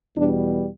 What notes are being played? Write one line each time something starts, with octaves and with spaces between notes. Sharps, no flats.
E2 B2 G3 D4